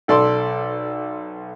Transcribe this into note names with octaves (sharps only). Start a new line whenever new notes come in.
B1 A4 D5 C6